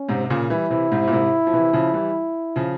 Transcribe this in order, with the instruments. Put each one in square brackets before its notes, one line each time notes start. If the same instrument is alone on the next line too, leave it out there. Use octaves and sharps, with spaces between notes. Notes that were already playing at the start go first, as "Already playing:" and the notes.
Already playing: [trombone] C#4
[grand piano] G#2 C3
C3
A#2 C#3
[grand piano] E3 G3 [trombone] E4
[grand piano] C3 E3
G#2 C3
A#2
G#2 C3
F3
C3 E3
C#3 F3
E3 G3
C#3 F3